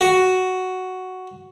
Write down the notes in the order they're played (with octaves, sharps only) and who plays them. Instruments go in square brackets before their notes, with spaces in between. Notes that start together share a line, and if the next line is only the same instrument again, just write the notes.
[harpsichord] F#4